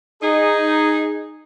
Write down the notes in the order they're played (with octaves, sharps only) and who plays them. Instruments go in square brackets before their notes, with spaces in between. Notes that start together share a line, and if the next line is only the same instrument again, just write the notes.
[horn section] D#4 G#4